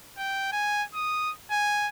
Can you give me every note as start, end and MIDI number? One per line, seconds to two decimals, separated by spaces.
0.18 0.52 79
0.52 0.83 80
0.94 1.31 87
1.51 1.88 80